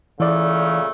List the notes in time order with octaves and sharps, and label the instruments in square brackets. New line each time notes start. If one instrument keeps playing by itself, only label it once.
[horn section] A#2 C#3 A3 [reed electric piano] E3 D5